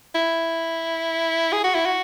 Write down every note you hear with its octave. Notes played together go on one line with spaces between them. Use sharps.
E4
G#4
F#4
E4
F#4